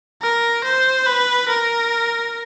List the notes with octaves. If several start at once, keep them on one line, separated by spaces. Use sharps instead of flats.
A#4
C5
B4
A#4